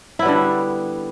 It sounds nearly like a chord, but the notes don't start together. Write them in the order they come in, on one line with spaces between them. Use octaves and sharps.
E4 B3 G3 D3